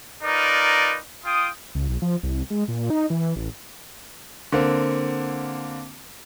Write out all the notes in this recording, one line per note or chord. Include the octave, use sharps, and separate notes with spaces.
D#4 F4 A#4 B4 D5
F4 G5 D#6
C#2
B1
F3
C2
G#3
A#2
D#4
E3
E3
A1
D3 A#3 C4